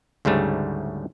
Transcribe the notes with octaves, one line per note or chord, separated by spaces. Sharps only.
D2 G#2 C#3 G3 A3